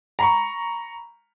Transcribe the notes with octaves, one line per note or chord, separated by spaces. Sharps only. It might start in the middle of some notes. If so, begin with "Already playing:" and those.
A#5 B5 C#6